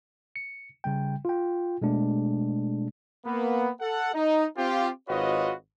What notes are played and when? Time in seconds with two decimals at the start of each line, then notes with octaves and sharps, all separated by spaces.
0.36 C#7
0.84 C#3 G3 G5
1.25 F4 G5
1.82 B2 G#3 A3 D4
3.26 A#3 B3
3.81 A4 F#5
4.14 D#4
4.57 C4 F4 G4
5.09 G#1 F4 F#4 B4 C#5 D#5